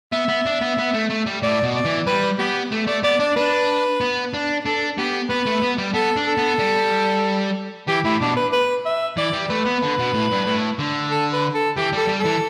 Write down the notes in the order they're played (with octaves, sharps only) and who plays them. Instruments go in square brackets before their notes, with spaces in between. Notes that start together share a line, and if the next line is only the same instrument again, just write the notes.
[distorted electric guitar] B3 [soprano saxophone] E5
[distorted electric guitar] B3
D4
B3
B3
A3
A3
G3
[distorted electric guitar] A2 [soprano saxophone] D5
[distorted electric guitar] B2
[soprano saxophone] D5
[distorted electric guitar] E3
[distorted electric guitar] G3 [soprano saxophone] B4
[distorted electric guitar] B3 [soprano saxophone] G4
[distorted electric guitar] A3
[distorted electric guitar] A3 [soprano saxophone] D5
[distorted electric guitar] B3 [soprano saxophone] D5
[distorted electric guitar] D4 [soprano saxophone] D5
[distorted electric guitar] D4 [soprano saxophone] B4
[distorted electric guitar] B3
D4
[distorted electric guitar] D4 [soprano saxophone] A4
[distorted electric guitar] B3 [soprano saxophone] G4
[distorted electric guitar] B3 [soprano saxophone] B4
[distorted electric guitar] A3
B3
G3
[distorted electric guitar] B3 [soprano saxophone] A4
[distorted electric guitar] D4
[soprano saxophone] A4
[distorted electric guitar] B3
G3
[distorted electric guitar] E3 [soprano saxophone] G4
[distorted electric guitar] A2 [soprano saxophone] E4
[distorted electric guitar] B2 [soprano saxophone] D4
[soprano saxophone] B4
B4
E5
[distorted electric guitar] E3 [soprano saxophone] D5
[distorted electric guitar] G3
[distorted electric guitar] A3 [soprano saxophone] B4
[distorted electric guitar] B3
D3
B2
A2
G2
A2
D3
[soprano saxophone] A4
B4
A4
[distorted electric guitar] E3 [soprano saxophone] G4
[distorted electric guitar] G3
[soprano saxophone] A4
[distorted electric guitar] G3
[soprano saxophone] A4
[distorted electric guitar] E3